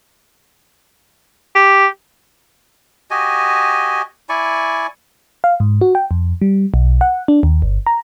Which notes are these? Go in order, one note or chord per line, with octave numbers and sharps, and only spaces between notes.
G4
F#4 G4 D#5 G#5
E4 D5 G#5 C#6
F5
G#2
F#4
G5
F2
G3
B1
F#5
D4
D#2
G1
A#5